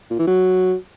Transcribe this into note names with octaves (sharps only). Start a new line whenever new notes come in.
A#2
E3
F#3